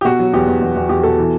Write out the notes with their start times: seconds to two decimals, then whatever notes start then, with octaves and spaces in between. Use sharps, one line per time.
0.01 G4
0.05 B2 F#4
0.19 F#3
0.33 E2 G4
0.47 E2
0.61 E2
0.76 E2
0.89 E2 G4
1.03 B2 A4
1.19 E3